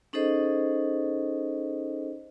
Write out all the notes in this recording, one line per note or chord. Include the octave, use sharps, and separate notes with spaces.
C#4 D#4 G#4 A4 C5 D#5